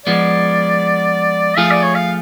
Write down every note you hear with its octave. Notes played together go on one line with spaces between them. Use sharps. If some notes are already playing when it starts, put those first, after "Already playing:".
F3 G#3 B3 D5
F3 A3 F4 G#4 F5
D5
C#5
F5